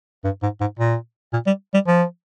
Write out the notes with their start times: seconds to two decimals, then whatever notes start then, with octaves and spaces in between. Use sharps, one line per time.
0.24 G2
0.43 G#2
0.61 G#2
0.79 A#2
1.33 A#2
1.47 G3
1.74 G3
1.87 F3